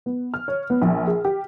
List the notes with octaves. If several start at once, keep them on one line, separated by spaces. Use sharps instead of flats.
B3
F6
C#5
B3
A#1
G#4
G4